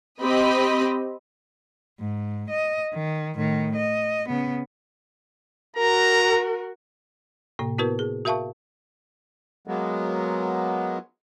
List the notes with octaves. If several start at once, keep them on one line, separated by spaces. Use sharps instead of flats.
C4 G4 D#5 B5
G#2
D#5
D#3
A2 D#3
D#5
C#3 B3
F#4 A#4 A#5
A2 C3 A#3
B3 E4 F#4 A#4 B4
G#4
F#4 A#4 E5 F5 A5 C#6
F#3 G#3 A#3 B3